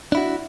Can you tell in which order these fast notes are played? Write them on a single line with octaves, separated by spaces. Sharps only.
D4 E4 F#4